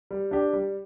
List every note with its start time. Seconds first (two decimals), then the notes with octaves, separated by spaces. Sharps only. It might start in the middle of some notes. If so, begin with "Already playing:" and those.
0.11 G3
0.31 D4 G4
0.53 G3